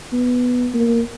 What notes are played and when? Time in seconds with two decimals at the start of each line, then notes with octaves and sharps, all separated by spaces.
0.13 B3
0.74 A#3